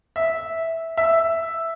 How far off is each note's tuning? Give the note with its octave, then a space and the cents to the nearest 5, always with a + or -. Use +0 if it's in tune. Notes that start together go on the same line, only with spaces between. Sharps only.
E5 -10
E5 +0